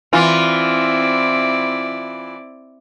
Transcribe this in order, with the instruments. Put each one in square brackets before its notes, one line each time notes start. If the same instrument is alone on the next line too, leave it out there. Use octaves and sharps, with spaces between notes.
[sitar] E3 F4 [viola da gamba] C4 E4 D5